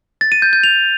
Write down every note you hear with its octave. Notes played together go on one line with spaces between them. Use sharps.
A6
D#7
G6
G6
F7